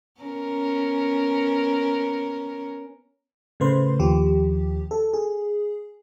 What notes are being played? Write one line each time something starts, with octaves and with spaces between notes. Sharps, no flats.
B3 C#4 A#4
A2 C#3 A3 B4 C5 C6
D#2 F3 G4
A4
G#4